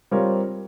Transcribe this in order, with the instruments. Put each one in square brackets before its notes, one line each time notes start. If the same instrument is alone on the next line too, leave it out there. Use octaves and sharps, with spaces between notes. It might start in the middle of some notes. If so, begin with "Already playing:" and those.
[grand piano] G3 C4 F4 A#4 C#5